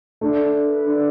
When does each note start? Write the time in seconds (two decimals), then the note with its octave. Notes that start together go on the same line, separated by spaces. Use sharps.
0.21 A3 D4
0.42 D4
0.63 B4
0.84 D4